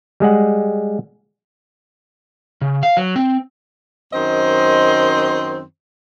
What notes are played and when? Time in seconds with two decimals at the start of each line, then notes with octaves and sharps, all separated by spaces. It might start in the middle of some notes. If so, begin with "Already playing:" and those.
0.20 G3 G#3 G#4 F#5
2.61 C#3
2.83 F5
2.97 F#3
3.16 C4
4.13 F#2 D#3 C4 C5 D#5